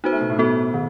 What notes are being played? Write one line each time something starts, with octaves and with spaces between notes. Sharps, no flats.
B3 D#4 F#4 C5
A3
B2
A2
B2 B3 F#4 A4
D#3